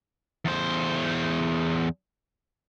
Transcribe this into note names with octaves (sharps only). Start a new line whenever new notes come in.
E2 C5